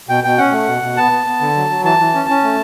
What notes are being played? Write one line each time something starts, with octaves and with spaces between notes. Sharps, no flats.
B2 G5
B2 G5
C#4 F#5
A3
B2
B2
B3 A5
B3
B3
D3
F#3
F#3
E3 A5
E3
C#4
C#4
A3